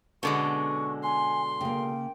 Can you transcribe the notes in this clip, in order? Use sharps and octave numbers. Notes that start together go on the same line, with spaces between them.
B2 D3 G#3 B3 C#4 A4 C#6
G#5 C6
C#3 A#3 G5